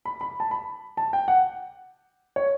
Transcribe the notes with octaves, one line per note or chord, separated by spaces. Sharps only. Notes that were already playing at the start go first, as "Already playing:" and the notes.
B5
B5
A5
B5
A5
G5
F#5
C#5